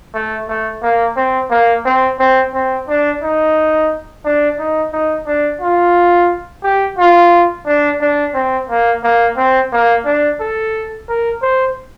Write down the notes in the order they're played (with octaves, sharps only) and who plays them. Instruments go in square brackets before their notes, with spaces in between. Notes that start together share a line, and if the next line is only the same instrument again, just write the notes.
[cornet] A3
A3
A#3
C4
A#3
C4
C4
C4
D4
D#4
D4
D#4
D#4
D4
F4
G4
F4
D4
D4
C4
A#3
A#3
C4
A#3
D4
A4
A#4
C5